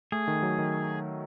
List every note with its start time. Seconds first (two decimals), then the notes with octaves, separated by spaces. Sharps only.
0.12 A3 G#4
0.28 D#3
0.43 F#3
0.58 D#3